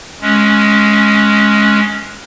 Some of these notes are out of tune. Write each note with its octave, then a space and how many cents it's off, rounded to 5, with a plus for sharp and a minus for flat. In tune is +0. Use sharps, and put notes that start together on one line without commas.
G#3 +15 C#4 +0